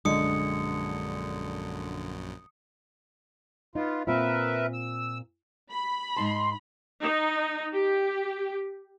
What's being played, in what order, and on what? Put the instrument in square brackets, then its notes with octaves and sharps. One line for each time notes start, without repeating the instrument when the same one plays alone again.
[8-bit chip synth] A#1 F#2 [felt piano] D3 [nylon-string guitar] G#3 [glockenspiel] D#6 C#7
[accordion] B3 F4 [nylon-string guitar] D#4
[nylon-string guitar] A#2 C4 F4 [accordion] A#4 B4 E5
[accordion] E6
[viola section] B5
[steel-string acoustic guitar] G#2 D#4 A5 [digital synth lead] C6
[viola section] D#4
G4